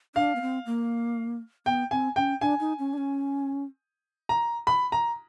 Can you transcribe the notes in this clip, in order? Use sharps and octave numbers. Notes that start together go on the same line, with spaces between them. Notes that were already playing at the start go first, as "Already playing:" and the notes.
D4 F5
B3
C4
A#3
B3 G5
C4 G#5
C#4 G5
D4 G#5
D#4
C#4
D4
C#4
A#5
B5
A#5